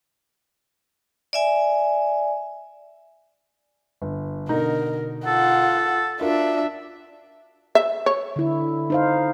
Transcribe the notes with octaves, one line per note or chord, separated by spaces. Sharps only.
D5 E5 G#5
G1
B2 D3 D#4 A#4
F4 A4 F#5
D4 F4 F#4 A#4 E5
E5
C#5
D3 E4
D#4 C5 F5